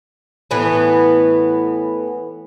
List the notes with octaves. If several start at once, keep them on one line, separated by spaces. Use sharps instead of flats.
A2 E3 B3